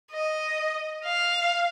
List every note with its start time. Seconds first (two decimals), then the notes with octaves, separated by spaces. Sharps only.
0.12 D#5
1.05 F5